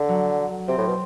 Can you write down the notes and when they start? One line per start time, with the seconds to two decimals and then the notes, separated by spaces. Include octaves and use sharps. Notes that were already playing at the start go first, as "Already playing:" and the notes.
Already playing: D3
0.09 F#3
0.68 C3 C4
0.78 A2
0.88 B2